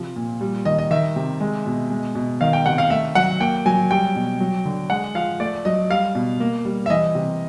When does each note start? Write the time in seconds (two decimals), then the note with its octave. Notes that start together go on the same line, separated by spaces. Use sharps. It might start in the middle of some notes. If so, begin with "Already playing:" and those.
Already playing: C3 F3
0.16 A#2
0.41 G3
0.65 D#3 D#5
0.79 D#5
0.91 D#3 E5
1.16 C3
1.40 G#3
1.66 B2
1.90 G#3
2.15 B2
2.41 D#3 F5
2.53 G5
2.66 C3 F#5
2.78 F5
2.90 A3 E5
3.15 F#3 F#5
3.40 A#3 G5
3.66 F#3 G#5
3.91 G3 G5
4.15 B2
4.40 F#3
4.65 D3
4.90 G#3 F#5
5.15 F3 F5
5.40 A3 D5
5.65 F#3 D#5
5.90 G3 F5
6.15 B2
6.40 A#3
6.65 G3
6.86 E5
6.90 E3 D#5
7.15 C3